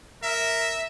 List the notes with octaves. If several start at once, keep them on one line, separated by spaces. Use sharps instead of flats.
A#4 E5